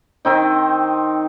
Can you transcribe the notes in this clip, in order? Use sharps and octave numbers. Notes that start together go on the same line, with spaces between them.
D#3 C4 D#4